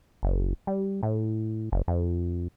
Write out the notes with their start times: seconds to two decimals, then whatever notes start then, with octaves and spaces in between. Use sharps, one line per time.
0.23 F#1
0.67 G3
1.03 A2
1.72 F#1
1.88 F2